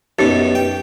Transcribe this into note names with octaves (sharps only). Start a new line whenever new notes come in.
F#2 B2 D#4 G4
G5